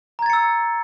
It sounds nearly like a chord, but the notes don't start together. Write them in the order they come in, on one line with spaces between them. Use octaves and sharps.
A#5 G#6 A6 C#7 E6